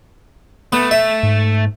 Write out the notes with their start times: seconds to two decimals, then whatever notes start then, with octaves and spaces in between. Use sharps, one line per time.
0.73 A3 B3
0.91 E5
1.23 G#2